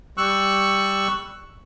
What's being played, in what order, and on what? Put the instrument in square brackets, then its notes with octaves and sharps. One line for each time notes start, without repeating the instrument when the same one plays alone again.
[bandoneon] G3 C#6 E6 F#6